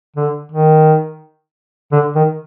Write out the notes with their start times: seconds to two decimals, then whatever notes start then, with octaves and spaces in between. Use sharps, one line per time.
0.16 D3
0.52 D#3
1.92 D3
2.16 D#3